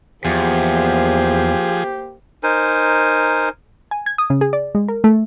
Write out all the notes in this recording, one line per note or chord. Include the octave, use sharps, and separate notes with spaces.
E2 F3 A#3 G4 G#4 C5
D#4 A#4 C5 G#5
G#5
G#6
D#6
C#3
G#4
D5
G#3
A#4
A3